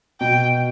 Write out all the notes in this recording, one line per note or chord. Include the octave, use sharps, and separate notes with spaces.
B2 G5